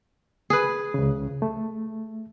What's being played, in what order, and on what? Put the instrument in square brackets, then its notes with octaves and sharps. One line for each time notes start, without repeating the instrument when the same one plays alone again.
[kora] G#4 B4
[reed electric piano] C#2 C#3
A3